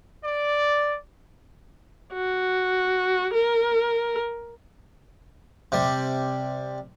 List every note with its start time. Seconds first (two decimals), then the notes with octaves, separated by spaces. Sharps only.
0.24 D5
2.13 F#4
3.34 A#4
5.72 C3 G3